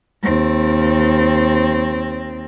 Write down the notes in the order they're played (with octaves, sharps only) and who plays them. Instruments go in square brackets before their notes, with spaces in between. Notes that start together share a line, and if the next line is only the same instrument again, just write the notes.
[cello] D#2 C4